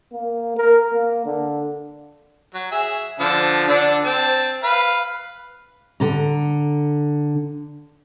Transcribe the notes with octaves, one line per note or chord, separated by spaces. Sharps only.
A#3
A#4
A#3
D3
F#3
G#4 E5
D3 F3 A5
D3 D4
C4 A5
B4 F5
D3 A#5